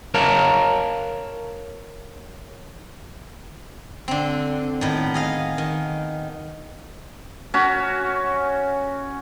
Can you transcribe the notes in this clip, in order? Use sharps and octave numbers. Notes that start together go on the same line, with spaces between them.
A#4 C#5 F5 A5 A#5
D3 C4
A2 D#3 B3
G#4 D#5 F5
D#3
C#4 F#4